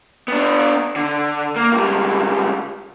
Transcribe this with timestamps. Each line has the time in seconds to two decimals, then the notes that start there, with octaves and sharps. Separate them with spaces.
0.28 B3 D4
0.96 D3
1.56 A#3
1.72 C#2 G3